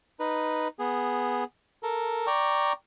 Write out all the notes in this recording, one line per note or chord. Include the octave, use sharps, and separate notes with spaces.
D#4 B4
B3 G#4
A4 A#4
D5 G5 A#5 C#6